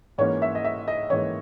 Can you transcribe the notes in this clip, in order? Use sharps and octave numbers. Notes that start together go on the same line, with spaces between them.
G#2 E3 A#3 C#4 C#5
E5
D#5
E5
D#5
G#2 E3 A#3 C#4 C#5